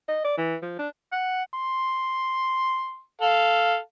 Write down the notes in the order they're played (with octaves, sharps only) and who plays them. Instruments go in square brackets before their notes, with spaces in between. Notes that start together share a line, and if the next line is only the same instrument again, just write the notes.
[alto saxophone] D#5
D5
E3
F3
D4
[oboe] F#5
[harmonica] C6
A4 F5